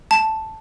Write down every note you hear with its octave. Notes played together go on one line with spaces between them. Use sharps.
A5